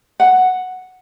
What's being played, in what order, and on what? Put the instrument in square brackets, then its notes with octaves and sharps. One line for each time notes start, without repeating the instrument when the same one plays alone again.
[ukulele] F#5